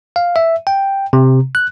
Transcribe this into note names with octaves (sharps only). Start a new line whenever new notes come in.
F5
E5
G5
C3
F#6